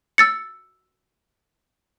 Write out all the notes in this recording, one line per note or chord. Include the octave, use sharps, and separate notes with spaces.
E6 A6 C#7